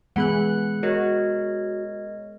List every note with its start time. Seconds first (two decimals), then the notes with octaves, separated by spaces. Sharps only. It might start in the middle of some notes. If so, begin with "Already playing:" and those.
0.16 E3 G#3 B3 G#4 F#5 B5 F#6
0.83 F#4 A#4 C#5 D#5